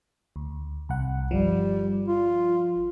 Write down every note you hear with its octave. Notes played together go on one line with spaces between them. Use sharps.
D2
C2 F#5
G1 F3 G3
F4